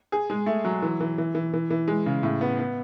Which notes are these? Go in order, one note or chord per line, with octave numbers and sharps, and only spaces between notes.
G#4
G#3
A3
F#3
E3
E3
E3
E3
E3
E3
G#3
C#3
A2
B3
B3